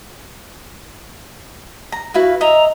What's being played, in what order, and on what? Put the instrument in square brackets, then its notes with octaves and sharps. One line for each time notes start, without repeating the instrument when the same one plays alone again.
[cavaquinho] A#5
[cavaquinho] E4 B4 F5 [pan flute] F#4
[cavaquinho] D#5 E5 [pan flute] A#5